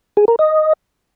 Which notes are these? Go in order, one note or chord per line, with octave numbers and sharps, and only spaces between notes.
G#4
A#4
D#5